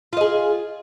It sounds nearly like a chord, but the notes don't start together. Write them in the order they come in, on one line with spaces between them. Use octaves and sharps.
F4 D#5 G#4